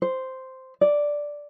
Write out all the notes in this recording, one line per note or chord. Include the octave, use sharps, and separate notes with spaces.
C5
D5